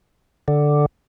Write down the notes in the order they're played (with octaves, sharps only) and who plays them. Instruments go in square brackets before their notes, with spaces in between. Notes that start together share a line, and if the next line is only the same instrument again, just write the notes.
[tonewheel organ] D3